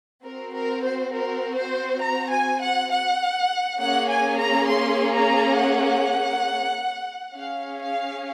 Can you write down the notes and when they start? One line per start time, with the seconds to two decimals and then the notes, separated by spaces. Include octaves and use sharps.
0.23 C4 F#4 A#4
0.54 A#4
0.84 C5
1.13 A#4
1.57 C5
2.02 A#5
2.31 G#5
2.62 F#5
2.91 F#5
3.80 A#3 C#4 G#4 F#5
4.10 G#5
4.39 A#5
4.68 C6
5.14 A#5
5.57 F#5
7.35 C#4 G#4 F5
7.81 F5